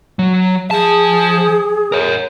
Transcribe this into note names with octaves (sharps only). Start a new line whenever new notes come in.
F#3
F3 G#4 A5
A#4 C#5